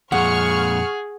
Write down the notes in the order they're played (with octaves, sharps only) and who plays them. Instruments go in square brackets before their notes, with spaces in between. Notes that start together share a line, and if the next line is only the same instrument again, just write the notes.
[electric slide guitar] F2 A#2 [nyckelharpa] G#4 [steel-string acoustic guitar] F#5 [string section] C#6 F6